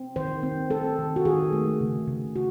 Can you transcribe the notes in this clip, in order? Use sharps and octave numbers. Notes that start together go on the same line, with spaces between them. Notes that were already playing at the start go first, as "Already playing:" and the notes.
Already playing: C4
D#3 C5
C4
C4 A4
D#3
F#4
D#3 G#4
A3
C#3
C#3
F#4